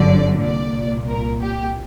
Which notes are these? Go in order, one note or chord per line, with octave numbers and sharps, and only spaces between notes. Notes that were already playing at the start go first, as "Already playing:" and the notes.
Already playing: G1 F#2 D3 D5
A#2 D5
C2
A#4
G4